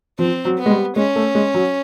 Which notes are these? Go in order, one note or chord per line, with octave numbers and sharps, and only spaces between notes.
F3 C4
F#3
B3
G#3
G3
G#3 C#4
A3
G#3
F#3